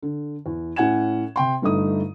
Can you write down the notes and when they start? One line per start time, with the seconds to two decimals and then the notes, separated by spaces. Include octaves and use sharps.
0.03 D3
0.46 E2
0.76 A2 C#4 F#5 G#5 G#6 E7
1.36 C3 G5 C6
1.62 G1 G2 A3 D#4 D#6